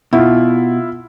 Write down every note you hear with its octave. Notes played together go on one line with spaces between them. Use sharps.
B2 E4 F4